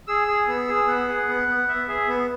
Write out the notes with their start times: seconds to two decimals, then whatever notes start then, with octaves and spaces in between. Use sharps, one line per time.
0.08 G#4 E6
0.28 G#4
0.48 B3
0.68 G#4
0.88 B3 F#5
1.08 G#4
1.28 B3
1.48 B3
1.68 B3 E5
1.88 G#4 E5
2.08 B3